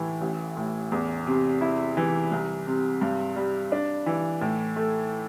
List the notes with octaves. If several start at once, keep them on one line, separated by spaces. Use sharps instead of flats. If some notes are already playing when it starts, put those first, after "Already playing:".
Already playing: A2 E3
A1
A2
E2
C3
E4
E3
C2
C3
G2
G3
D4
E3
A2
A3